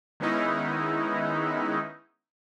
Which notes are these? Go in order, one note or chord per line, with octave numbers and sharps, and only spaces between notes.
D#3 G#3 B3 C#4 D#4 E4